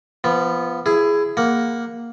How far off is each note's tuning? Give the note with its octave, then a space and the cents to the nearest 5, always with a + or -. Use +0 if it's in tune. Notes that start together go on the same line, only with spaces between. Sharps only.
F3 -20 B3 +0
E4 +20 G#4 +0
A#3 +0 F#5 +0